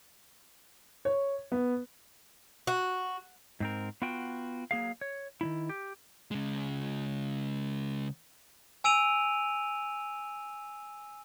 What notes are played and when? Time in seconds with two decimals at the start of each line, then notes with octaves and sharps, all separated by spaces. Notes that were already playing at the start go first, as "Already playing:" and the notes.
1.05 C#5
1.52 B3
2.67 F#4
3.60 G#2 C4 A#4
4.02 B3 F4 F#4 G5
4.71 F#3 A#3 G#4 F5
5.01 C#5
5.41 D#3 G3 E4
5.69 G4
6.31 C#3 G#3
8.84 G#5 E6 D7 D#7 F7